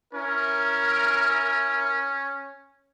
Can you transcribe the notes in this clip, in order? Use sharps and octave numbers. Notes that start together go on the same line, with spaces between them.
C#4 E4 A#4